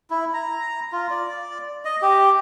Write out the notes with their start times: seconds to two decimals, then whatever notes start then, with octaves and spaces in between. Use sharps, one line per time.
0.10 E4
0.34 A#5
0.92 F4
1.10 D5
1.85 D#5
2.02 G4